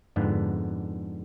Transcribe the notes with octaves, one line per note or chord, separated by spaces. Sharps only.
F2 G#2 D3 B3